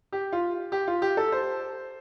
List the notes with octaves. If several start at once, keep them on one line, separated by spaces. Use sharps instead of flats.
G4
F4
G4
F4
G4
A4
C5